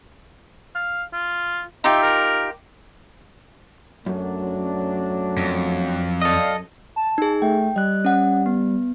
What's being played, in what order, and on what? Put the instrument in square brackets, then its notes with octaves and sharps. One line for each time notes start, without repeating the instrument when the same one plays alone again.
[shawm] F5
F4
[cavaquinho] D#4 F4 G4 [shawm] E5
[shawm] A#4
[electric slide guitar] F#2 [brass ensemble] F#3 A3 D4
[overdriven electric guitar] F2
[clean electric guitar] A4 D#5 [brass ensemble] D5 F5
[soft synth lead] A5
[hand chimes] D#4 G#4
[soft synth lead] A3 [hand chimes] G5
[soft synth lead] G3 [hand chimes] D#5 F#6
[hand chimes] C#4 F#5
B3